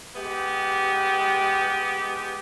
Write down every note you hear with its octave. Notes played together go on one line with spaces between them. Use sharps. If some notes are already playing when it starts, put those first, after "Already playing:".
G#3 B3 G4